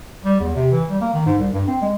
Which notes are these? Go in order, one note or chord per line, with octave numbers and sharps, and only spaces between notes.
G3
E2
C3
E3
G3
A#3
D#3
G#2
C2
G2
C4
G#3